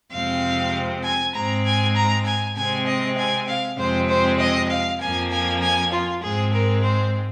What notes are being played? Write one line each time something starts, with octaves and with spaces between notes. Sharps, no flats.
F2 C3 G#3 C4 F5
G#5
G#2 G#3 C4 A#5
G#5
A#5
G#5
C3 G#3 C4 G#5
D#5
G#5
F5
F2 C3 G#3 C4 C5
C5
D#5
F5
F2 F3 A#3 G#5
G#5
G#5
F4
G#2 G#3 C4 G#4
A#4
C5